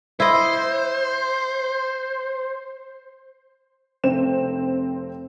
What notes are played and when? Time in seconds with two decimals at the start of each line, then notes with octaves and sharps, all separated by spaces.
0.20 E4 C5 D#5
4.04 F1 C4 C5 E7